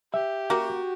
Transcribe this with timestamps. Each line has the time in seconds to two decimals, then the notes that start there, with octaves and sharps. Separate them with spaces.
0.14 G4 E5
0.50 A#3 F#4